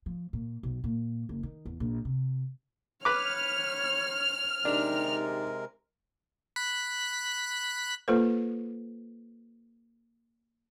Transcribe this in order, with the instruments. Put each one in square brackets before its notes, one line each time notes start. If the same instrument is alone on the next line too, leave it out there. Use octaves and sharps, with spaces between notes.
[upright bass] F3
A#2
B1
A#2
F#1
D#3
E2
A#1
C3
[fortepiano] B4 D6 [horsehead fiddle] C#5 [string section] F6
[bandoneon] C3 G#3 A#4 [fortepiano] D4 [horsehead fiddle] D#4 G4
[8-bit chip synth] B5 F#6 B6
[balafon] A#3 F4 A4 B4 C5